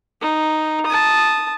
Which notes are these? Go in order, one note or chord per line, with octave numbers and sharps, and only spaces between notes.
D#4
A5 D#6